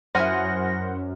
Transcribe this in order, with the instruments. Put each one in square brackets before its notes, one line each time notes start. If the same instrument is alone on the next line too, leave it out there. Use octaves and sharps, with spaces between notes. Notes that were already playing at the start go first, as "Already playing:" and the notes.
[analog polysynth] F#2 [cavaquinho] E4 G#5 D#6 [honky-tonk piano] C5 F#5 F6 [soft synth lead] A#6